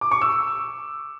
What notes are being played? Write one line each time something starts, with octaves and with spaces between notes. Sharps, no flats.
D6
C#6
E6